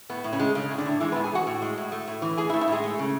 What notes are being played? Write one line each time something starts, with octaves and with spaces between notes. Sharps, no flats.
A2 B3
A2
C#3 C#4
G#3
C#3 G#3 C#4
A2
D3 D4
A2
E3 G#3 E4
B3 B4
A2
G#4 G#5
E3 F#4 F#5
A2
G#3
A2
A3
A2
E3
A2 G#4 G#5
E4 E5
A3
E4 E5
A2 G#3 G#4
A3
C#3